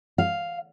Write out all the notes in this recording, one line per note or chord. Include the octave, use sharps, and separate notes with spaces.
F5